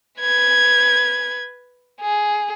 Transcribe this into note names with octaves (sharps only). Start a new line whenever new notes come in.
B4 G#6
G#4